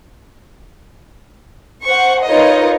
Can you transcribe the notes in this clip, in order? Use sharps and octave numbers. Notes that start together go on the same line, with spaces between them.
C5 F#5 C#6
D#4 F4 A#4 B4 C#5 D#5